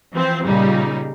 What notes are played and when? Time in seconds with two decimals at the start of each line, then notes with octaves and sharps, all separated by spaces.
0.13 E3 F3 C4 C5
0.45 A#2 C#3 G3 D#4